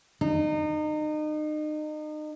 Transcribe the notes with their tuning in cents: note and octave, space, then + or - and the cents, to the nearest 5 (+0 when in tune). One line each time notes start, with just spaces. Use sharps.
D#4 -30